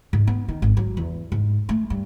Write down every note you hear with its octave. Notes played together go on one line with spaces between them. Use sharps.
G#2
B3
D#3
G#1
F#3
E2
G#2
A3
G2